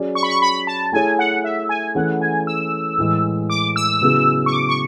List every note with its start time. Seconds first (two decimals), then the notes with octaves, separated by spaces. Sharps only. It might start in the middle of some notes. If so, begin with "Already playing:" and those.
Already playing: F#3 C#4 G#4 D5
0.15 C#6
0.23 B5
0.30 C#6
0.42 B5
0.67 A5
0.92 A3 E4 G#4 C#5 G#5
1.19 F#5
1.44 E5
1.69 G#5
1.95 E3 A3 C#4 E4 G#4 F#5
2.21 G#5
2.47 E6
2.98 A2 E3 G#3
3.50 D6
3.76 E6
4.01 C#3 F#3 B3 E4 G#4
4.46 C#6
4.52 D6
4.69 C#6